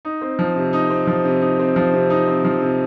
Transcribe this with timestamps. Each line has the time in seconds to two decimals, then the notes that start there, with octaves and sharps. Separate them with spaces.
0.05 D#4
0.21 C4
0.39 F3
0.56 C3
0.73 D#4
0.90 C4
1.07 F3
1.25 C3
1.41 D#4
1.59 C4
1.76 F3
1.93 C3
2.10 D#4
2.27 C4
2.45 F3
2.62 C3